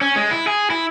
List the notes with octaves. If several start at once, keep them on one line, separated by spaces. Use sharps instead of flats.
C#4
G#3
E4
G#4
E4